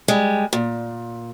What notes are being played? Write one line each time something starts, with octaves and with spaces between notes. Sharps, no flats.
G3 G#3
A#2